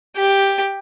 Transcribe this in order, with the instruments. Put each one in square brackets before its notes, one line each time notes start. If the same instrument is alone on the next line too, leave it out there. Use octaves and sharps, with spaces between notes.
[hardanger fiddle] G4